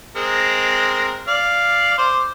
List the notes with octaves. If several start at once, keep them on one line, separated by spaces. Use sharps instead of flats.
G#3 C4 A#4
D5 F5
C5 D6